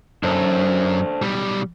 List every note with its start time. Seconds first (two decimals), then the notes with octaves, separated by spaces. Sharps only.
0.23 F#2 D4 A4 C5
1.22 B1 G3